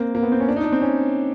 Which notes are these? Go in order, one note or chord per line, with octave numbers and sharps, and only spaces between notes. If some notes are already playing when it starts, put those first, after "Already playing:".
Already playing: A#3 C4
A#3
B3
C4
C#4
D4
D#4
D4
C4
C#4